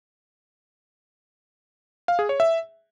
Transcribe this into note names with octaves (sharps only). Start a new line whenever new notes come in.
F5
G#4
C#5
E5